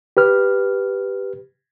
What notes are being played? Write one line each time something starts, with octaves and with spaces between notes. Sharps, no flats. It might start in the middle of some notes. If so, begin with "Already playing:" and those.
G4 B4 F6